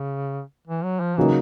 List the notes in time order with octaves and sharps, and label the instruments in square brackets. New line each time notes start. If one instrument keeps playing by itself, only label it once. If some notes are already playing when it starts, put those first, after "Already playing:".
Already playing: [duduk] C#3
E3
F#3
F3
[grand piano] C#3 F#3 A#3 D#4 [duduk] E3